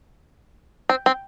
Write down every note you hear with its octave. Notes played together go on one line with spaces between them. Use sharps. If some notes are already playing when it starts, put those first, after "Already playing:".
C4
C4